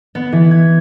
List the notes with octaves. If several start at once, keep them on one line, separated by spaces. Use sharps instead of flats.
B3
E3
G#6